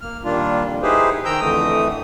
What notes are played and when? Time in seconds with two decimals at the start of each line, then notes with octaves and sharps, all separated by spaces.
0.01 A#3 F6
0.24 A#2 D#3 G3 A#3 D4 F4
0.64 F2
0.83 D#4 E4 G4 G#4 B4 C5
1.25 D#3 G5 A#5 E6 G6
1.41 F2 D3 E3 A3 D#6